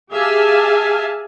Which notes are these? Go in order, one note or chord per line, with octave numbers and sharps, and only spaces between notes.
G4 G#4 E5 F5 G#5 A5